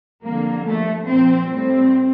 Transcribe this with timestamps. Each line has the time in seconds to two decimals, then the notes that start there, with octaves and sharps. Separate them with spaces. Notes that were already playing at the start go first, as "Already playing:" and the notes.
0.23 F2 D3 G3 A#3
0.65 G2 F3 A3
1.06 A#2 F3 C4
1.48 A2 G3 C4